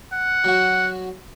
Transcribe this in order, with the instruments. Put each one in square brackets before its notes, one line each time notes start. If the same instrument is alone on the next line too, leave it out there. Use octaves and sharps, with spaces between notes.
[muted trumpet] F#5
[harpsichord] F#3 F#4